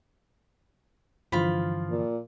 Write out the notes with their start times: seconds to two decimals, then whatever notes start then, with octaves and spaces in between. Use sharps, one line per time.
1.32 G2 D3 E3 F3 F4 B5
1.90 A#2